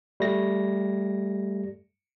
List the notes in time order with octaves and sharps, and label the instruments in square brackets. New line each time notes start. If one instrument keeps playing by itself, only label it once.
[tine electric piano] G3 A3 A#6